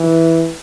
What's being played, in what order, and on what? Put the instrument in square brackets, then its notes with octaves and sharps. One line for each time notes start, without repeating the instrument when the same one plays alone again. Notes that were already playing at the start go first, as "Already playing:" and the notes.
Already playing: [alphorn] E3